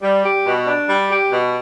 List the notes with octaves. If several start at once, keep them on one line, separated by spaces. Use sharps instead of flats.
G3
G4
B2
D4
G3
G4
B2